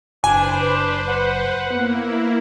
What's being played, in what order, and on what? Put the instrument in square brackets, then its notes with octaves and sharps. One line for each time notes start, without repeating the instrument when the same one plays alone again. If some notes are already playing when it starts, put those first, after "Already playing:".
[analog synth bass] F#1 [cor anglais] D4 [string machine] B4 C5 [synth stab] G#5
[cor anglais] F#5
[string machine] A#3 E4 [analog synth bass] B3